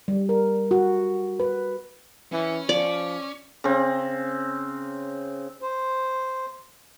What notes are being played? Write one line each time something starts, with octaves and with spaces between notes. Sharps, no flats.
G3
A#4
F#4
B4
E3 C#4
F3 D5
C#3 C4
C5